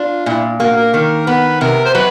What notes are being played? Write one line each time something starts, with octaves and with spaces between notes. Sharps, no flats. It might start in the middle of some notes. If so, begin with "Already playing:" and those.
Already playing: D4 F4
A#2 E4
A#3 F#4
A#4
D#3 A#4
B3 B4
C3 A#4
C5
F#3 B4